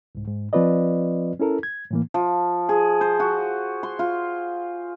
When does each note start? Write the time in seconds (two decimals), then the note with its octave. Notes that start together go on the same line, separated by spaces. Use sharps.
0.15 C2 G#2
0.28 G#2
0.53 F3 C4 F4 B4 D5 D#5
1.40 C#4 E4 A4 A#4
1.63 G#6
1.91 A2 E3 A#3
2.14 F3
2.69 G#4
3.01 C5
3.20 F#4
3.83 C6
3.99 F4